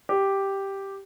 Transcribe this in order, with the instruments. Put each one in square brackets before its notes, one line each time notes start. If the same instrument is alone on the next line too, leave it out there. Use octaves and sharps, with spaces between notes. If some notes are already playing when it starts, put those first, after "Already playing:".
[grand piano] G4